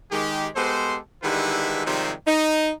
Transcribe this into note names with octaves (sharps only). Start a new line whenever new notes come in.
D#3 G#3 G4
G#3 B3 G4 A4 C5
D3 D#3 G3 G#3 E4 B4
C3 D#3 F3 G3 G#3 C4
D#4